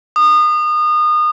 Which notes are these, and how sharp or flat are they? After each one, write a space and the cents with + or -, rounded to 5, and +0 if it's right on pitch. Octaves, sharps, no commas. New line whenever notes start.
D#6 -30